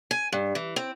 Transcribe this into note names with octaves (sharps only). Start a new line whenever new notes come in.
G#5
G2
E3
C4